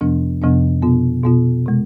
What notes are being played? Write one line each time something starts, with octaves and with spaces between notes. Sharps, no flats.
F2 C3 F3 B3 D4
F2 C3 F3 B3 D4
B2 B3 F4
B2 B3 F4
C3 G#3